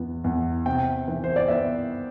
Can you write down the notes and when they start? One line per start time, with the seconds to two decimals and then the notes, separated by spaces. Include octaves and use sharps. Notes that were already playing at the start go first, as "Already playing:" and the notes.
Already playing: E2 B3
0.24 E2
0.66 C3 G5
1.08 E3
1.24 C5
1.36 D5
1.48 B3 E5